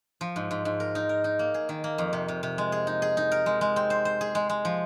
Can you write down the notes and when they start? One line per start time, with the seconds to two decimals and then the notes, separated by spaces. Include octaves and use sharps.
0.21 F3
0.36 G#2
0.51 G#2
0.65 G#2
0.80 A#4
0.95 D#4
1.09 A#4
1.24 D#4
1.39 A#3
1.54 G#4
1.69 D#3
1.84 A#3
1.98 F2
2.13 C3
2.28 C3
2.43 C3
2.58 G#3
2.72 G#4
2.87 D#4
3.02 G#4
3.17 D#4
3.32 A#4
3.46 G#3
3.61 G#3
3.76 C4
3.90 C5
4.05 C5
4.21 G#4
4.35 G#3
4.49 G#3
4.65 F3